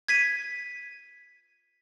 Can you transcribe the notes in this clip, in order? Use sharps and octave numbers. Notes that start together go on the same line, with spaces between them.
G#6 B6 D#7